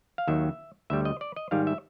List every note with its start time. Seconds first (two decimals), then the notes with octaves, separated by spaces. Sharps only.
0.18 F5
0.27 D#2 D#3 F#3 E5
0.90 D2 D3 G3 E5
1.05 D#5
1.21 D5
1.36 D#5
1.51 G#2 D#3 G3 F5
1.67 E5